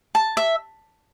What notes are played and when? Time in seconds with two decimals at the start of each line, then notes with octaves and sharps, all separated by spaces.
0.15 A5
0.37 E5